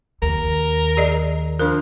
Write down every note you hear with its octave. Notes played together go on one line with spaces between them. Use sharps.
D#2 A#4
G#4 D5 D#5
F3 D4 A#4